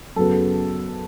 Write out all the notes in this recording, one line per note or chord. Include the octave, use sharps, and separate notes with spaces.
F#2 C#3 F#3 B3 A4